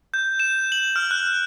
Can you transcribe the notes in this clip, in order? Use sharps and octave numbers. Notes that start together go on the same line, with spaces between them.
G6
E7
F#7
F6
F#6